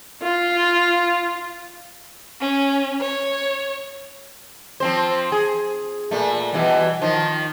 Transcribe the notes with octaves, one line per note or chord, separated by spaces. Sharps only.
F4
C#4
C#5
F3 C4 C5
G#4
A#2 A3
B2 E3 G3
D#3 F3